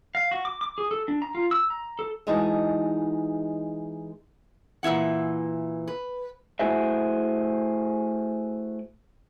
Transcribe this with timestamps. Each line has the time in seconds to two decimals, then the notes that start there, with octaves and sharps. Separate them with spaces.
0.15 F5
0.31 F#4
0.45 D6
0.61 D6
0.78 G#4
0.91 A4
1.08 D4
1.22 A#5
1.35 F4
1.51 E6
1.70 A#5
1.99 A4
2.27 E3 G#3 D#4 F#4 G#4 A5
4.83 A#2 E3 E4 F#5
5.88 B4
6.59 A3 E4 F#4 G#4 C5 E5